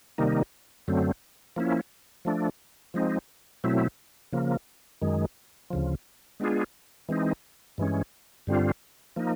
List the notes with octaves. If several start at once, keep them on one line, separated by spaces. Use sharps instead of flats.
C3 D#3 G3 A#3 D#4
F#2 D3 F#3 A3 C4
F3 A#3 C#4 E4
F3 A3 D4
F3 G#3 C4 D#4
B2 F#3 A3 C4 E4
C#3 F3 A#3
F#2 D#3 G#3
D2 C#3 F3
G#3 B3 D4 F4 G#4
E3 G#3 C4 D#4
G2 E3 G#3 C#4
G2 D3 G3 C4 F4
F3 A#3 D#4